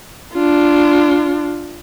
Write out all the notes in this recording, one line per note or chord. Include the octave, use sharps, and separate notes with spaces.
D4 F4